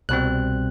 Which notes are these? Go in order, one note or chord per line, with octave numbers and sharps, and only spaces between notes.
C2 B2 G3 C4 F#6